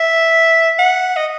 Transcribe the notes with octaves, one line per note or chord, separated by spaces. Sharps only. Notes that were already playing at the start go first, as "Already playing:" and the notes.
Already playing: E5
F#5
D#5